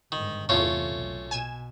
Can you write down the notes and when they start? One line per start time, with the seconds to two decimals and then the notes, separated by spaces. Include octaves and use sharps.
0.12 G1 G#2 D#3
0.49 E2 A2 C3 A3 C#4 F4
0.91 B1
1.31 B2 G#5 G#6 E7